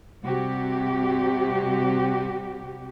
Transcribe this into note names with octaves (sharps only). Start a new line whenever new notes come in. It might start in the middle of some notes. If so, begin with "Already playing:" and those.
C3 G3 F#4 G4